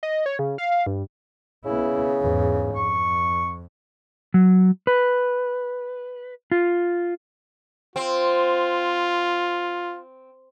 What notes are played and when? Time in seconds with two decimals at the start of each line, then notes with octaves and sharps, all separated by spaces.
0.03 D#5
0.26 C#5
0.39 C#3
0.58 F5
0.87 G2
1.65 C#3 B3 E4
2.21 E2 G#2
2.75 F2 C#6
4.34 F#3
4.87 B4
6.52 F4
7.96 C4 F4